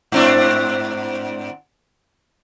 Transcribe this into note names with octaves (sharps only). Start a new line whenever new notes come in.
G#2 C4 D4